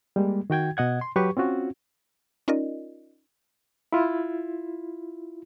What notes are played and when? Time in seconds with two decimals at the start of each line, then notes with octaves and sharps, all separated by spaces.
0.16 G3 G#3 A#3
0.50 D#3 F#4 G5 G#6
0.77 B2 D#5 F#5 G#6
1.01 C6
1.16 F#3 G4 B4 C#6
1.37 C4 C#4 F4 F#4
2.48 C#4 D#4 F4 A#4 D5 D#5
3.93 E4 F4